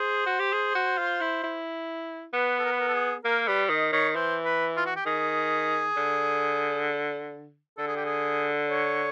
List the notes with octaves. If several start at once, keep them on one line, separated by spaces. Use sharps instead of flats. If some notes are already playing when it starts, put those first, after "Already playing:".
Already playing: G#4 C5
F#4
G4
G#4
F#4
F4
E4
E4
B3 B4
A4
A#4
B4
A#4
A4
G#4
A#3 A#4
G3 B4
D#3 D#5
D#3 C#5
E3 C5
B4
F4
F#4
G4
D#3 G#4
D3
D3 A4
G#4
G4
G#4
C#5